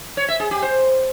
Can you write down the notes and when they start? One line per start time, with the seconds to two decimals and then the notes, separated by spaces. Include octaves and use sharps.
0.17 C#5
0.28 E5
0.40 G#4
0.51 G4
0.62 C5